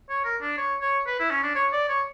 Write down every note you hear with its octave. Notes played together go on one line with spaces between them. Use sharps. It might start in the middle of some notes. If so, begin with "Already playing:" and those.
C#5
A#4
D4
C#5
C#5
B4
E4
C#4
D4
C#5
D5
C#5